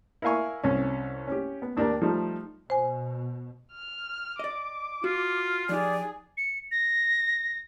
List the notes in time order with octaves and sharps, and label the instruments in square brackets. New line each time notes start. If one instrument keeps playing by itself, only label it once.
[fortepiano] E4 A#4 E5 F5 G#5 C#6
C2 C#4
C#4 G4
B3
D#2 D4 G4 A#4 D5
F3 G3 A3 D#4
[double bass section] B2 [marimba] C5 G#5
[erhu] F6
[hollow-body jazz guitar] D5 D#5 [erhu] D6
[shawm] F4 [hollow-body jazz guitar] F#4
[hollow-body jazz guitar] F3 D#4 G4 [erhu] G#4 [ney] D5
[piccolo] C#7
A#6